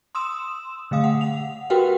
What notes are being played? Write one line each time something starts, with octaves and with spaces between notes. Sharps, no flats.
C6 D#6 E6 E7
D3 A3 F5 D#6
F#5
F#5 F7
F#4 G4 A#4 B4 F#5 G5